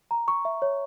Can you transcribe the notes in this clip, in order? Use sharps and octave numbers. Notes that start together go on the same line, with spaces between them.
A#5
C#6
E5
C#5